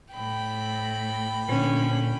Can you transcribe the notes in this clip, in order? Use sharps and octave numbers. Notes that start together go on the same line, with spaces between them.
A2 G5 B5
A#2 D3 C#4